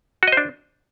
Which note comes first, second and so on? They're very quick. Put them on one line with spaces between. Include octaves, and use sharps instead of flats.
F#4 D#5 C5 D4